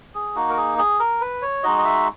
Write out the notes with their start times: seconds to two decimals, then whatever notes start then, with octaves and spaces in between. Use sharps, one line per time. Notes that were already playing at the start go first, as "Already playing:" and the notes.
0.15 G#4
0.36 A#3 D#4 F#4
0.50 A#4
0.57 G#4
0.78 G#4
1.00 A#4
1.21 B4
1.42 C#5
1.63 G#3 D#4 F#4 D#5
1.78 D#5
1.85 E5